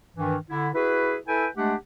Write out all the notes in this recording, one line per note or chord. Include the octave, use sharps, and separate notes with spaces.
G2 D#3 E3
D3 E4
E4 F#4 G#4 B4
E4 A4 B4 G5 G#5
G#3 A3 D4 G4 F#5